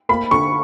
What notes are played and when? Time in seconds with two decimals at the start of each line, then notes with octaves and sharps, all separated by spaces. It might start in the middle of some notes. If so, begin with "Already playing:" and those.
0.09 A#3 B5
0.31 D3 C#6